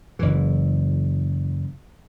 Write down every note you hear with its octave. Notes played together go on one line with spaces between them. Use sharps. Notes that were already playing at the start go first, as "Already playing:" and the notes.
F#1 E3